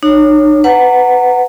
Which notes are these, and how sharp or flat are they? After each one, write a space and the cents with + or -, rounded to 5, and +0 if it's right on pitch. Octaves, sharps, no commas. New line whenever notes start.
D#4 -40 C#5 +0
B4 +20 F#5 +0 A#5 -25